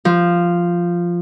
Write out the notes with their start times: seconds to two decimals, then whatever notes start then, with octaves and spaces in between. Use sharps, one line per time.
0.05 F3